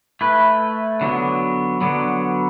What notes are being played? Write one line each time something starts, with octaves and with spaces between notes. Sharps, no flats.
A3 E4 B4
D3 F#3 B3
D3 F#3 B3